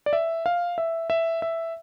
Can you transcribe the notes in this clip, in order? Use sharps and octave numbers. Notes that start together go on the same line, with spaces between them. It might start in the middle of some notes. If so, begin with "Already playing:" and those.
D5
E5
F5
E5
E5
E5